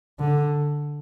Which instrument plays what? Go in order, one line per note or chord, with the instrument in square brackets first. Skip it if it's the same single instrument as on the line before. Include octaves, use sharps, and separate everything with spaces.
[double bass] D3